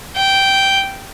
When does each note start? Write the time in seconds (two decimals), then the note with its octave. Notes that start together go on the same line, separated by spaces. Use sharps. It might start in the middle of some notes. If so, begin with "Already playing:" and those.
0.16 G5